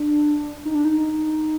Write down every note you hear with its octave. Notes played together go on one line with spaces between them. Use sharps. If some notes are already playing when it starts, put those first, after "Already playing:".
Already playing: D4
D#4
D4
D#4